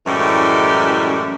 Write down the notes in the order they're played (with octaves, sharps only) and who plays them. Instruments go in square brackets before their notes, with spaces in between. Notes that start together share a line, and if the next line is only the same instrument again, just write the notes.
[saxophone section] F#2 A2 E3 G3 G#3